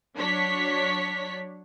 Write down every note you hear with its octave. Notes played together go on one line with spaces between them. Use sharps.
F#3 D4 C#5 B6